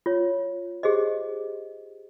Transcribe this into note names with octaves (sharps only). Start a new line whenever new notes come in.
F4 C#5
G4 G#4 C5 D#5